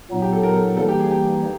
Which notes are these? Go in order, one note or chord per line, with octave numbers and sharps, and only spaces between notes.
A#2 F#3 B3 D#4
G4
A4
A#4
A4
E3 G3 A#3 D#4 A4
G4
G#4
G4